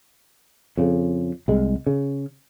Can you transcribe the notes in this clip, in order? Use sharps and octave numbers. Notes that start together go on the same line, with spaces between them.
F2 C#3
C2 G#3
C#3